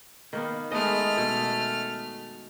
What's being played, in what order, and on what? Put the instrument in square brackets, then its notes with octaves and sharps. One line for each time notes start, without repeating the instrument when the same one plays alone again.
[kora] D#3 A#3 B3
[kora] G#3 B3 D#5 [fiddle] A3 F6
[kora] B2